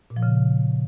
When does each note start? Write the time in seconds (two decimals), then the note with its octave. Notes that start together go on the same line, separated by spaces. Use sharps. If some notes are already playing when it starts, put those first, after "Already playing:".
0.10 A#2
0.16 F3
0.23 C#3